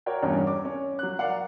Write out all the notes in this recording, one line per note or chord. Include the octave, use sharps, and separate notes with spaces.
F#4 A#4 C#5 D5 G5
E2 G2 C#4
D6
C#4
F#3 F#6
A#4 D5 F5 F#5